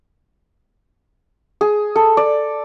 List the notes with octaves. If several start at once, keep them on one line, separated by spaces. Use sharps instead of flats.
G#4
A4
D5